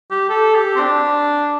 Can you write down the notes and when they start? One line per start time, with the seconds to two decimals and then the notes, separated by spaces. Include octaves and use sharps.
0.11 G4
0.29 A4
0.55 G4
0.76 C4
0.79 D4